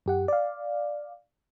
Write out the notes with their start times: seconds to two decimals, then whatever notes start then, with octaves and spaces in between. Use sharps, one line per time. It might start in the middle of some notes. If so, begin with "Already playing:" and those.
0.06 F#2 G4 F#5
0.28 D5 F5